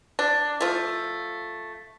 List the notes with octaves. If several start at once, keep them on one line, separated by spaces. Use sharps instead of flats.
D4
F3 A3